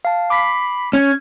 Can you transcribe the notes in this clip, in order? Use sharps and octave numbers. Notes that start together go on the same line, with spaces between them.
F5 A5
B5 D6 B6 C7
C#4 G#6